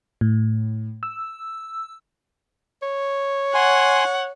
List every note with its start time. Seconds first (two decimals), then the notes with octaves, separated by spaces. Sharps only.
0.21 A2
1.03 E6
2.82 C#5
3.54 F#5 G#5 C6